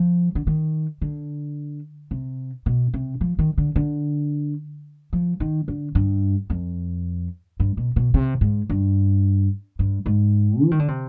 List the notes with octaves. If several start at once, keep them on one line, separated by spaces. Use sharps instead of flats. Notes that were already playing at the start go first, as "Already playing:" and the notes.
Already playing: F3
D3
D#3
D3
C3
B2
C3
F3
D#3
D3
D3
F3
D#3
D3
G2
F2
G2
B2
B2
C3
G#2
G2
G2
G#2
F3
D#3
D3
C3